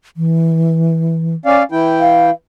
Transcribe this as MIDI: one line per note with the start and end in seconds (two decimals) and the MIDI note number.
0.17 1.35 52
1.45 1.63 61
1.45 1.63 74
1.45 1.63 77
1.72 2.30 52
1.72 2.30 64
1.72 2.30 79
2.00 2.32 77